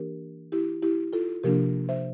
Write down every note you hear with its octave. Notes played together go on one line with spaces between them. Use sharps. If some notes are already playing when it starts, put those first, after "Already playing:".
Already playing: E3 A#3 D4 G4 A#4
E4 G4
E4 G4
F4 A4
C3 F3 A#3 D4 G4 A#4
C5 E5